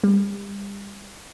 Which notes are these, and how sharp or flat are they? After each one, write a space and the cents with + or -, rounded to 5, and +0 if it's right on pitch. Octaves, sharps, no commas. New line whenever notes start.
G3 +35